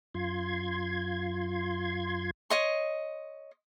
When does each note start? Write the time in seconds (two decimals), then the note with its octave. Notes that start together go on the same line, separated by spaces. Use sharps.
0.14 F#2 F4 C6 G#6
2.50 C#5 D#5 C6